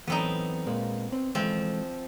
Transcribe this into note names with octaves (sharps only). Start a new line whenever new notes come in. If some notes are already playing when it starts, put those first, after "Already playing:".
E3 F#3 A3 B3 C4 D#4
A#2 G#3 A#3
C4
E3 F3 G#3 A3 C4